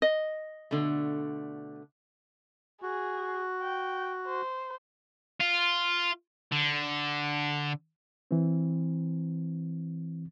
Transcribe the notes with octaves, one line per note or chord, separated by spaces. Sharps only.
D#5
B2 D3 A3
F#4 G#4
G5
C5
F4
D3
E3 C4